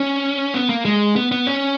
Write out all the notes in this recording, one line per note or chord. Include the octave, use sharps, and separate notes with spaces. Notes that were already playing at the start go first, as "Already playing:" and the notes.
Already playing: C#4
B3
A#3
G#3
B3
B3
C#4